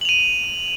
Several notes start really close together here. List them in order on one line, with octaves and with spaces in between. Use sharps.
F#7 F7 D#7